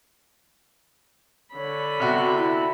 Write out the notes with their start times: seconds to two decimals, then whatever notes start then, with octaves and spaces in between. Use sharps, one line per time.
1.54 D3 C#5 B5
2.00 C3 B3 F#4
2.32 E4